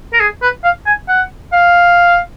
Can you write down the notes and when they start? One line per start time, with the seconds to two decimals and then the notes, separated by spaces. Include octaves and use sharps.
0.13 A#4
0.20 G#4
0.42 B4
0.64 F5
0.86 G#5
1.08 F#5
1.53 F5